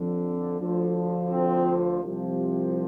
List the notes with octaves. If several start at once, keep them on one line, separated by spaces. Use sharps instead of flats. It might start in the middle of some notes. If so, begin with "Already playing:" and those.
Already playing: F2 D3 F3
D2 D3 F3
C4
C2 C3 F3